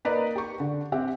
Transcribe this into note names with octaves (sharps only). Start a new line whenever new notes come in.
A#3 D#4 B4 D5 A#5
G4 C#6
D3
C4 G4 E5 F#5